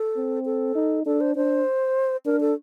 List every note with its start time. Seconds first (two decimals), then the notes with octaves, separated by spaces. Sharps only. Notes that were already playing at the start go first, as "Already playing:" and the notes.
Already playing: A4
0.16 C4
0.46 A4
0.75 D#4
1.06 D4 A4
1.21 C5
1.36 D4 C5
2.26 D4 A#4
2.41 A4